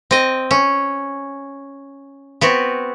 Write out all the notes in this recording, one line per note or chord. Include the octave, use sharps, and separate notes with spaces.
C4 D#5
C#4
B3 C4 F#4